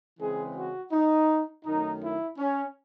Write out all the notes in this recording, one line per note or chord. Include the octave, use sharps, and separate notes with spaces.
C#3 E3 G#3 C4 G#4
F#4
D#4
F#2 D#3 A3 D#4
E4
C#4